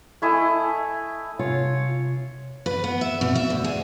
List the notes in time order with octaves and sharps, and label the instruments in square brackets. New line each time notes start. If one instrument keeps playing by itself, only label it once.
[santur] A3 E4 D#5 G#5
[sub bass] C3 [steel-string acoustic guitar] F4 [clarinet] C#5
[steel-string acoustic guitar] B4
B3
E5
B2
E5
D2
G#4